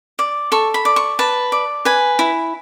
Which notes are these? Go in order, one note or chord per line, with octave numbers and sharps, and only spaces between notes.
D5
A4 C#6
B5
D5
C#6
B4 A5
D5
B4 G#5
E4